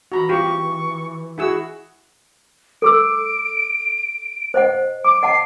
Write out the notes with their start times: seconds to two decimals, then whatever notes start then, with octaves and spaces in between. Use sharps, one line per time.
0.12 E3 F#4 A#5 B5
0.29 F4 G4 C#6
1.38 E4 F#4 G#4 E6
2.82 A4 D6 E6 D7
4.54 C5 D#5 F#5
5.05 D6 D7
5.23 D#5 F#5 A5 C7